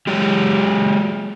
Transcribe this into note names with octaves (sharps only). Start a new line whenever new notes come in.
F#3 G#3 G4